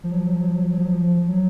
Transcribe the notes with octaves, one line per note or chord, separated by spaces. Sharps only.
F3
F#3
F3
F#3
F3
F#3
F3
F#3
F3
F#3
F3
F#3
F3
F#3